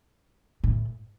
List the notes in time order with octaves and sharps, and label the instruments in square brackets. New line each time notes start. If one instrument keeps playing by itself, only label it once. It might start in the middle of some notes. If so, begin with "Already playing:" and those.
[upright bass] A2